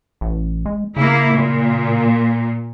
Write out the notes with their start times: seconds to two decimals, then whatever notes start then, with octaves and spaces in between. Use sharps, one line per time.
0.21 A1
0.66 G#3
0.97 C#3 A#3 E4
1.33 A#2